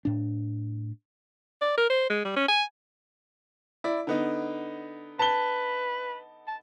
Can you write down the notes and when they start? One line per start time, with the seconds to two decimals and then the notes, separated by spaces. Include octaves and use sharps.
0.05 A2 D4
1.62 D5
1.78 A#4
1.90 C5
2.10 G#3
2.25 G3
2.36 C#4
2.49 G#5
3.84 E4 D5
4.07 D3 B3 D#4
5.19 B4 A5 G7
6.48 A5